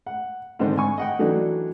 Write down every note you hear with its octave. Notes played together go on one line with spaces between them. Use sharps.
F#5
G#2 D3 D#3 C4
G#5 C#6
D#5 F#5 G5
E3 F#3 A3 D4 D#4